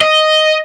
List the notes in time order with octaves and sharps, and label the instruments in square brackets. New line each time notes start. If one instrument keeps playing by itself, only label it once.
[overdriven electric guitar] D#5